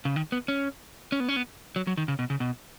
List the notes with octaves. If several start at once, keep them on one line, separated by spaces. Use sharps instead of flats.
C#3
D#3
B3
C#4
C#4
B3
C#4
B3
F#3
F#3
D#3
C#3
B2
C#3
B2